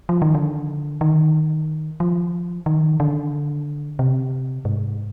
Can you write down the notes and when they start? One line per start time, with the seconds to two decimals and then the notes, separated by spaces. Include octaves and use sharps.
0.09 F3
0.22 D#3
0.35 D3
1.01 D#3
2.00 F3
2.66 D#3
3.00 D3
3.99 C3
4.65 G#2